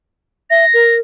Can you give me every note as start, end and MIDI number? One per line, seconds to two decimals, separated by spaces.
0.50 0.65 76
0.50 0.96 94
0.74 1.00 70